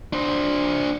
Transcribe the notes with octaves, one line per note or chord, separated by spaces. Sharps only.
D4 C5